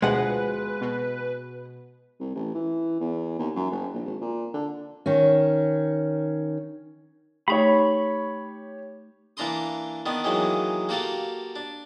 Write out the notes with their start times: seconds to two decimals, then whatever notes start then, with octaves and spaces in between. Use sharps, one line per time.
0.02 D2 B2 F3 G#3 B4 F#5
0.81 B2
2.20 C2
2.35 A1
2.55 E3
3.00 E2
3.39 D#2
3.56 F#2
3.71 F#1
3.94 A#1
4.06 G#1
4.21 A#2
4.54 D3
5.06 D#3 C#4
7.48 A3 D#4 G4 C#5 B5 C#6
9.37 E3 A#3 D4 A#5 C6 D#6
10.06 D#3 B3 D4
10.24 D#3 E3 F#3 G#3 A#3
10.89 A#3 F#4 G4 A4 F5
11.56 D4